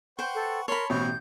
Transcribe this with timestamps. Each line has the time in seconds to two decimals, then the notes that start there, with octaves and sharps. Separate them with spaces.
0.19 B4 C5 F#5 G5 C#6
0.35 A4
0.68 A#4 C#5 A5 B5 C6
0.90 A1 B2 F#3 C4 C#4 C#6 G6